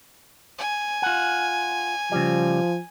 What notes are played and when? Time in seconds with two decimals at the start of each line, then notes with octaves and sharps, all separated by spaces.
0.59 G#5
1.02 F4 F#5
2.12 C#3 F3 G3